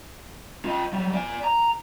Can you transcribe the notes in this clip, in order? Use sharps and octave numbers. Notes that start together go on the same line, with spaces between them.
F4 D#5
F#3 G3
D5 G#5
A#5